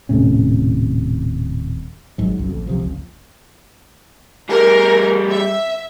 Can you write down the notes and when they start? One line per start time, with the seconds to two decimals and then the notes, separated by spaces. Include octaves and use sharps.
0.09 D#1 A2 C3 C#4
2.18 G#1 G#2 F#3
2.36 G1 C#2 F#2
2.49 A1 F2
2.67 C#2 C3 F3
2.80 F#1 C#2
4.49 G3 G#4 A#4
5.30 E5